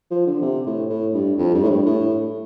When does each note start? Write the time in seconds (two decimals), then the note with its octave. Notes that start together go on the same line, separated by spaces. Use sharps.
0.11 F3
0.27 D3
0.42 C3
0.66 A2
0.90 A2
1.14 G2
1.38 F2
1.54 G2
1.63 A2
1.69 G2
1.86 A2